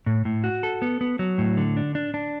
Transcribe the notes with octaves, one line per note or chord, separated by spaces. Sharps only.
A2
A2
F#4
A4
B3
B3
F#3
A2
D3
D4
D4
D4